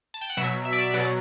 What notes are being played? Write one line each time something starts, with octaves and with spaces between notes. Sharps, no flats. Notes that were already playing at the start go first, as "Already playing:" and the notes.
A5
G5
F#5
B2 F#3 E5
E5
D5
E5
B2 F#3 D5